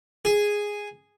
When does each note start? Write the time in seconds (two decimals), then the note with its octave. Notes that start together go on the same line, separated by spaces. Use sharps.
0.25 G#4